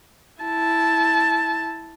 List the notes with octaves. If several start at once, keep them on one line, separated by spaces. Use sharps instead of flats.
E4 A5